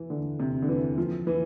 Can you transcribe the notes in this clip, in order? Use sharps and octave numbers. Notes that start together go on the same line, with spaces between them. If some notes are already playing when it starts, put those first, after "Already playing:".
Already playing: E3
D3
C3
D3
E3
F3
E3